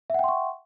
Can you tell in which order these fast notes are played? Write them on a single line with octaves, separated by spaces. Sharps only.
E5 F#5 G5 C6 C#6